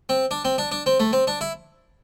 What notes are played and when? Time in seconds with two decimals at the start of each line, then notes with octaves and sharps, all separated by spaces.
0.09 C4
0.31 D4
0.45 C4
0.58 D4
0.71 D4
0.86 C4
1.00 A3
1.13 C4
1.27 D4
1.41 E4